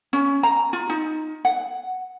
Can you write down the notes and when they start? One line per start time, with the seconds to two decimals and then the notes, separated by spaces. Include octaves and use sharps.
0.13 C#4
0.43 A#5
0.73 F4
0.90 D#4
1.45 F#5